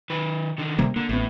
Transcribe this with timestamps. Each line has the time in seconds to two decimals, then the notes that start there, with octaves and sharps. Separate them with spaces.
0.10 D#3 B4
0.58 D3 D#3
0.79 C3 G3 A#3
0.96 D3 A#3
1.09 A1 A2 B3